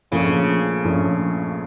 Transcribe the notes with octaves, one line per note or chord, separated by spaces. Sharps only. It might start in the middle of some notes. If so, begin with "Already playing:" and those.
A#1 A#2 C#3 F3 A3 C#4
A#1 A#2 F3 A3 C#4